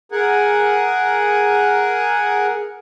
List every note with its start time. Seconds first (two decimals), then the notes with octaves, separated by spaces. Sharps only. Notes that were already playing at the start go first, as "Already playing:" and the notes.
0.12 G#4 A#4 F#5 G#5